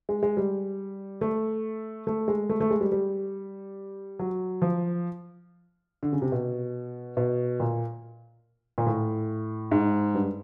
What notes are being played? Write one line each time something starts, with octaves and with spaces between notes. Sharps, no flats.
G#3
G#3
G3
A3
A3
G#3
A3
A3
G#3
G3
G3
F#3
F3
D3
C#3
C3
B2
B2
A#2
A#2
A2
G#2
G2